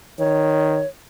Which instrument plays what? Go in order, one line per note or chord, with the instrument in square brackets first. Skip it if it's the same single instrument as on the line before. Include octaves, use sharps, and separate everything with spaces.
[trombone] D#3 [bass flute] C#5